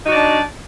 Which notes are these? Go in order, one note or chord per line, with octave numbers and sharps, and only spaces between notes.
D4 D#4 F#4 D5